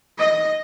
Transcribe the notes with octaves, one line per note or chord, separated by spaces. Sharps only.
D#5